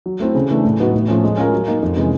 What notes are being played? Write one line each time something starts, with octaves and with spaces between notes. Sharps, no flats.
F#3
A3 C4 E4
C#3
E3 A3 D4
A2
F#3 B3 D#4 F#4
A2
F3 A3 C#4
G#3
C#4 F4 A#4
F#3
A#3 D#4
F2
C3 E3 G#3 C#4